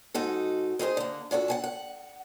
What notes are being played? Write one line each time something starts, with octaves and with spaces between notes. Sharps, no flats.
G#2 D#4 F#4 A4
D#4 G#4 A4 C5
D3 A#3
A#2 D4 F#4 A4
F#5 G#5 A5
F#5